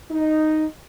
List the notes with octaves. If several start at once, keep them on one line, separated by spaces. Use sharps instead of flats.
D#4